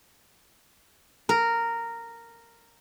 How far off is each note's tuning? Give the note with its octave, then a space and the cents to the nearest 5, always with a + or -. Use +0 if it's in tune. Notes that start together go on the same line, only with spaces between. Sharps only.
A#4 -10